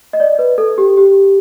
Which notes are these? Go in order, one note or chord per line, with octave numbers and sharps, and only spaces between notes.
D#5
D5
B4
A4
G4
G4